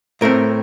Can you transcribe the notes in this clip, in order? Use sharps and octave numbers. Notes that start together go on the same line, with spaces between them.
A2 A3 C4 A#4